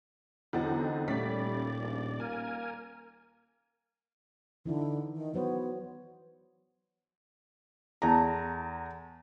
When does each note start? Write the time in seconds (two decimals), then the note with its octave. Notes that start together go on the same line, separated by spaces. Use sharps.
0.53 E2 B2 D3 F#3 C4 D#4 F#5 A6
1.08 D#1 A#2 G3 A3 C#4 D5 B6
1.79 A#1
2.20 A#3 A#4 G#5
4.66 D3 E3 D#4 E4
5.16 D#3
5.34 F#3 B3 C5 C#5
8.02 E2 E4 A4 A#5